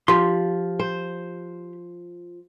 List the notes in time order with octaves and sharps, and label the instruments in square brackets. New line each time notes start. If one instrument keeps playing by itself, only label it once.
[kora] F3 [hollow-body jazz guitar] G4 C6
[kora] C5